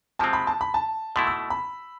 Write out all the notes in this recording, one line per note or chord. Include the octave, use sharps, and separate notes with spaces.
C3 F3 G#3 C4 A5
B5
A5
B5
A5
B2 A3 E4 C6
E6
B5